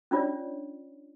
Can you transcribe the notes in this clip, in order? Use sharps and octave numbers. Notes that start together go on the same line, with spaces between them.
C#4 D4 F4 C#5 D5